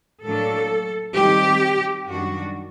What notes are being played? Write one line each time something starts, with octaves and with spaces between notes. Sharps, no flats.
A2 F#3 A#3 D4 A4
D#3 G3 C4 D#4 G4
F#2 D#3 G3 D4 F#4